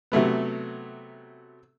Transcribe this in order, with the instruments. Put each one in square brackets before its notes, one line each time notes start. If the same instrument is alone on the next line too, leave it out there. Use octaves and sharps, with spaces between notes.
[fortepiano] C3 F#3 A3 B3